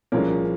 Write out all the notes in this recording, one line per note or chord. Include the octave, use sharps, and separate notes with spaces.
C2 A#2 F3 G#3 A#3 C#4